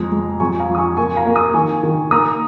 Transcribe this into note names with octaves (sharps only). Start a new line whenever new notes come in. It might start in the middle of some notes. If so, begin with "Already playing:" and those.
Already playing: F2 G#3 A#5
G#3
F2 G#5 C#6
F5 A#5
F3
D#6
G#5 C#6
A#3 G#5 C#6
F5 A#5
A#3
A#5 D#6
D#3 G#5 C#6
D#3
A#3 A#5 D#6